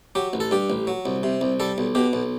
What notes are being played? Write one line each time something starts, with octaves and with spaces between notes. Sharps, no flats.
F#3 G4
A1
A4
G2 G4
A1
F#3
C2
C3
C2
G3 A4
B1
B2 G4
B1